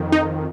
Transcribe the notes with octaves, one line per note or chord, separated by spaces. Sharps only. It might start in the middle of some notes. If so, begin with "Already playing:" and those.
Already playing: F2 D#3
D#4